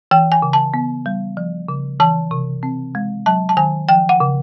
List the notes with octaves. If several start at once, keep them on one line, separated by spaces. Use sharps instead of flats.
E3 G5
G#5
C#3
A5
B3
G3
F3
C#3
E3 A5
C3
C4
G#3
F#3 A5
A5
D#3 G#5
F3 G5
F#5
C#3